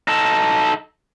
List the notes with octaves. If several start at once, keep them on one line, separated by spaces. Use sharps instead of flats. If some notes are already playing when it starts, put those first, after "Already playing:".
D#4 A4